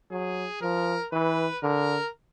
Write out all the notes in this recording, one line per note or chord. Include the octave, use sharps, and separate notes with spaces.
F#3 G#4
F3 A#4
E3 B4
D3 A#4